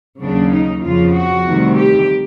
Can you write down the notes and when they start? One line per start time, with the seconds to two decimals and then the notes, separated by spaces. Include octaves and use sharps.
0.21 D#2 C#3 F#3 A#3 D4
0.52 D#4
0.83 F2 C#3 F3 F4
1.14 F#4
1.45 D2 C3 D#3 G3
1.76 G4